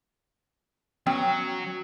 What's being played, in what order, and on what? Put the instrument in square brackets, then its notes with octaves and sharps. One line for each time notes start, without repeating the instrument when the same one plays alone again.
[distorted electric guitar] F#3 [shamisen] B3 C#4 G5